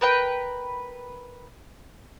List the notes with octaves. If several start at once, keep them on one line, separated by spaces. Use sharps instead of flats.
A#4 B4 G5